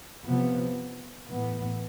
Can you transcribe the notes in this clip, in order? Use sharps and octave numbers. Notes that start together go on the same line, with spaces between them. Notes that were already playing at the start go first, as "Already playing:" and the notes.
C3 F3 B3
A2 E3 B3